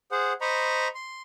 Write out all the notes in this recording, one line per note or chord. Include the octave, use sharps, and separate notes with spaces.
G#4 C5 F#5
C5 D#5 A#5 B5 C#6
C6